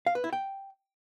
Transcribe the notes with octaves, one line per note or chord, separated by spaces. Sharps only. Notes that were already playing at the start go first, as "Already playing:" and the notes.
F5
B4
E4
G5